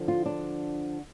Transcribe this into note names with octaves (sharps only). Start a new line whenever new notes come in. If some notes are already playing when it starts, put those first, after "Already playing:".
Already playing: D3 F3
F4
D4